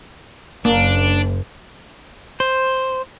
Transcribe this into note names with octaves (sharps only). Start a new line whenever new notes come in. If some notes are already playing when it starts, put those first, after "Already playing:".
F#1 A#3 D4
C5